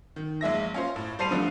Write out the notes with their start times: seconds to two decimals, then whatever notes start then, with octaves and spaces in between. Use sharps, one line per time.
0.16 D#3
0.41 A#1 G#3 E5 A#6
0.74 C#4 F4 C5
0.96 A2
1.19 G3 C5 A5 C7 D#7 F7
1.31 D3 F3 A3